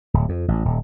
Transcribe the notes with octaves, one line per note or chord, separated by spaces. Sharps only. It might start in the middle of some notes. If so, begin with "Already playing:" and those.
D1
F2
A1
D#1